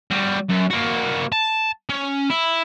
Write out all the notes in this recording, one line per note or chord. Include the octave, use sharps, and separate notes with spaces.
G3 F#4
F#2
A#3 F#4
A5
C#4
E4